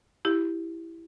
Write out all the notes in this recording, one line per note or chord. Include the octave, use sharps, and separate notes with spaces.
E4 G4